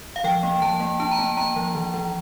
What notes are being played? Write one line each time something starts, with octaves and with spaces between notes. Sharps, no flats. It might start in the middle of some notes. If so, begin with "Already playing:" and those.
F5
F3 G5
A#3
F3 A5
A#3
D4 A5
A#5
A#3 A5
A#3 A#5
F3
E3
E3